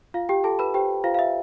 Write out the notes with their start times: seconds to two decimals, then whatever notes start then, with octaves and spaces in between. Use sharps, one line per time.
0.14 F4 F5
0.29 G4 G5
0.44 F4 A4 A5
0.59 B4 B5
0.74 G4 C5 G5
1.04 F4 C5 F5
1.15 F5
1.19 E5